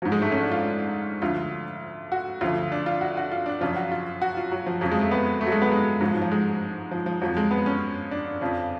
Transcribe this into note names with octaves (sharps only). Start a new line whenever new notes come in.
G#2 F3 F#3
G#3
A3
C#4
D4
F4
D2 D3 F3 F4
F#4
D2 C#3 F3 F4
D4
F4
F#4
F#4
F4
D4
F#2 C#3 F3 F4
F#4
F4
F#4
F4
F#3
F3
F2 C#3 F3 F#3
G#3
A3
B3
A3
F#3
G#3
B3
G#3
G#2 F3 F#3
F3
F3
G#3
F3
F3
F2 F3 F#3
G#3
B3
C#4
D4
F2 C#3 F3